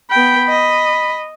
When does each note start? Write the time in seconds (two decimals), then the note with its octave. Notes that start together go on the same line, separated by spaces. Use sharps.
0.10 B3 G5 B5
0.49 D#5